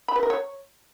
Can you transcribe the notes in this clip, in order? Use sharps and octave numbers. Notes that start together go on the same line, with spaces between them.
B5
B4
A#4
C#5